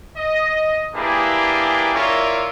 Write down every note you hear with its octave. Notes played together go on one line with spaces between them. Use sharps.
D#5
A#3 D4 E4 G4 G#4 B4
E4 F4 A#4 C#5 D5 E5